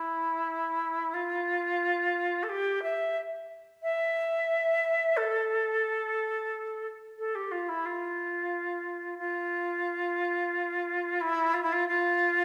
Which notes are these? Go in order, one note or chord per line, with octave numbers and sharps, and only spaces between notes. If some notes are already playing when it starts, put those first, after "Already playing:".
Already playing: E4
F4
A4
G4
E5
E5
A4
A4
G4
F4
E4
F4
F4
E4
F4
E4
F4
F4